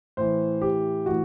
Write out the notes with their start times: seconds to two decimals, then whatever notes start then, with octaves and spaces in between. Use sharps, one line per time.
0.17 A2 E3 C5
0.62 G4
1.06 A2 E3 F#4